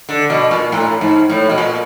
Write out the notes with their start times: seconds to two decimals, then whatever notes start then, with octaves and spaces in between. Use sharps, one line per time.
0.09 D3
0.30 B2
0.51 A#2
0.72 A2
1.01 G#2
1.29 A2
1.49 B2
1.58 A#2